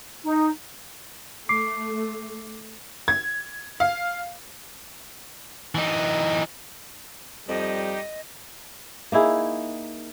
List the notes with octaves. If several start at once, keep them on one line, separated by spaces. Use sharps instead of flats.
D#4
A3 D6 C7
G#6
F5
E3 D#4
F2 G3 D#4 G4 D#5
A#3 D#4 E4 G#4